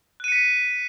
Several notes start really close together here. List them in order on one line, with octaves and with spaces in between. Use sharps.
F#6 D#7 C#7 B6